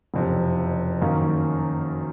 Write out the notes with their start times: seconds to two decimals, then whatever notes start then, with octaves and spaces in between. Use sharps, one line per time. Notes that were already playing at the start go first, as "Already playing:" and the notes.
0.14 F#1 F2 C3
1.01 F#2 D#3 A#3 C#4